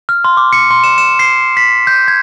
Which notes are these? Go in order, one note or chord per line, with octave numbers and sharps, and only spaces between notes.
F6
C6
D6
C#7
C6
E7
E7
C7
B6
G6
G#6